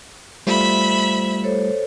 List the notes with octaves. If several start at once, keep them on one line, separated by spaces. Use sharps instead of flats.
G3 A3 F4 C5 E5 B5
A4 C5 C#5